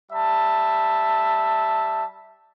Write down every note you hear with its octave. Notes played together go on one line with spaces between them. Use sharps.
G3 E5 A5